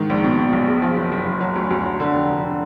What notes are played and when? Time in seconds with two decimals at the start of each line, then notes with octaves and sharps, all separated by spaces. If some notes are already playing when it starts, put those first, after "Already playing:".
Already playing: G#2 D#3
0.10 A#1
0.24 B2
0.38 B2
0.53 B1
0.68 G#3
0.82 F3
0.97 F#1
1.12 F#1
1.27 F#1
1.41 F#3
1.56 D2
1.71 D2
1.85 F#3
2.00 D3
2.14 F1
2.29 F1
2.44 D3